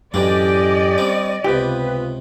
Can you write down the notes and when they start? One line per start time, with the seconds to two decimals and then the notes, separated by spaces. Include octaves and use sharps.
0.14 F#2 A2 E3 C#4 D4 G4 D5 D#5
0.98 G3 C4 D4
1.44 C#2 C3 B3 F4 G4 B4